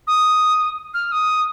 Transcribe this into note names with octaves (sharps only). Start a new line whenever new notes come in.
D#6
F6
D#6